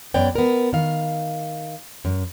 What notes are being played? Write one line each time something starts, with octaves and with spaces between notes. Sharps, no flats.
F#2 B3 C#5 D5 G5
B3 A#4
D#3 F5
F#2